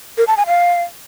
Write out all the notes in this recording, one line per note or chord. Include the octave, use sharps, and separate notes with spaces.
A#4
A5
G#5
F5